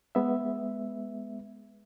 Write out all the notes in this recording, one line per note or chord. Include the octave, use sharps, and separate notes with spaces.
G#3 B3 E5